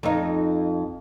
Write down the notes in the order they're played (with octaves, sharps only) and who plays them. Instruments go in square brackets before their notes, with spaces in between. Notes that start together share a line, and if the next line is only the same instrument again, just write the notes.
[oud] F2 D#4